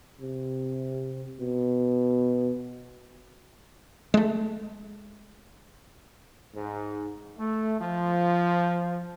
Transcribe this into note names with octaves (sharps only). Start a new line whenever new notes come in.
C3
B2
G#3 A3
G#2
A3
F3